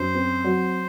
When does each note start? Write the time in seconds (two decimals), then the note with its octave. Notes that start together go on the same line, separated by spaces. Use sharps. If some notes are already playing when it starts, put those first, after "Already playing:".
Already playing: F#2 C5
0.15 C4
0.44 F#3